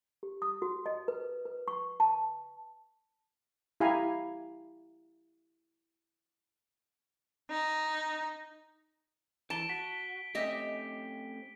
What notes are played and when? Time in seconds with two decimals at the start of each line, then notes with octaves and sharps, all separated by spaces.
0.23 G4
0.42 D#6
0.62 F#4
0.86 D#5
1.08 B4
1.45 B4
1.68 C#6
2.00 A5
3.80 E4 G4 F5 G#5 A#5 B5
7.50 D#4
9.50 E3 A5 D7 G7
9.69 F#4 B6
10.35 A3 C4 C#4 G4 D#5 E5